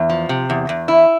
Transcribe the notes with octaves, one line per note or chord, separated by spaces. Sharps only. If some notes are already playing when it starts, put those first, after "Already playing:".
Already playing: E2
F3
C3
E2
E2
E4